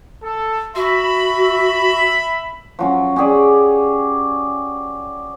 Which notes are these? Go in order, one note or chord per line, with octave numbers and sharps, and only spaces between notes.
A4
F#4 E5 B5
F3 F#3 C#4
C#4 G4 G#4 D5